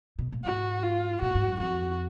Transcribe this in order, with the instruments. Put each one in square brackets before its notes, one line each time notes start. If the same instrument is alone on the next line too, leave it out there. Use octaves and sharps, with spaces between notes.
[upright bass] B2
A#2
[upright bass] G#2 [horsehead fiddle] F#4
[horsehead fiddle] F4
[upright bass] A#2 [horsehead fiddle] F#4
[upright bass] G#2
F#2
[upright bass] F2 [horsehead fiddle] F#4